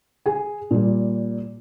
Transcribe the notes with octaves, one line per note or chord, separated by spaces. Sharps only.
G#4 G#5
A#2 G3